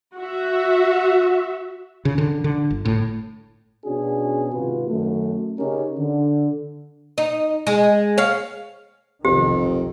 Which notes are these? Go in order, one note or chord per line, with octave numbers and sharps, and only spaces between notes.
F#4 E5
C#3
D3
D3
G1
A2
B2 C#4 D4 F#4 G#4
G#1 C3 F4 F#4 B4
F#2 D#3 A3
C#3 C#4 D#4 G4 A#4
D3
D#4
G#3
C#5 F5
F1 B1 F2 D#3 G4